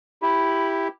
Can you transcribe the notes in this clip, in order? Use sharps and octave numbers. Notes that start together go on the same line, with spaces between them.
E4 G4 B5